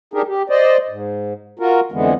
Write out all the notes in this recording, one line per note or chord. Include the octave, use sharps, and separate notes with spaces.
D4 D#4 G4 G#4 A#4
G4
C5 D5 D#5
G#2
F4 F#4 A#4
F2 D3 E3 G#3 B3